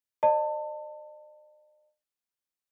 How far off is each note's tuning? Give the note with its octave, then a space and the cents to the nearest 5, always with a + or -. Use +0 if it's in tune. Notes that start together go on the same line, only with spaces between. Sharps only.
C5 +40 D#5 -45 A5 +25